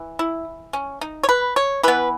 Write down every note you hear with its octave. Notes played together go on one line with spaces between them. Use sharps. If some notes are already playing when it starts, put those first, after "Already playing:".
Already playing: E3
E4
C#4
D#4
C#5
B4
C#5
E3 B3 B4